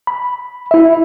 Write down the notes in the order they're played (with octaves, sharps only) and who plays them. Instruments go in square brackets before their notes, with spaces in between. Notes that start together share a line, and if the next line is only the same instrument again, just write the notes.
[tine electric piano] B5
E4 E5